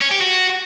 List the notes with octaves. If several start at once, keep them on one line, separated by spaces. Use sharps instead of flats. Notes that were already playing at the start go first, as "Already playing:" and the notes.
C#4
G4
F#4